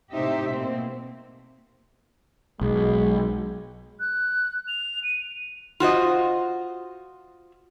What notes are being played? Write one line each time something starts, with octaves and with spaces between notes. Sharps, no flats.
A2 C3 D#4 G4 C5 E5
B2 A#3 C4
B1 G#3
F#6
F7
D#7
F4 F#4 C5 D#5